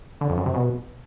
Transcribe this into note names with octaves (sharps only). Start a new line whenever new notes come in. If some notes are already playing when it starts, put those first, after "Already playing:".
D3
F2
F#2
C3
B2